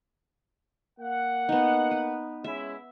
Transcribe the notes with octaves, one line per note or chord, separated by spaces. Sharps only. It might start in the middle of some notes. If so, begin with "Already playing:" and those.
A#3 F#5
B3 D#4
B4
G#3 C#4 E4 E5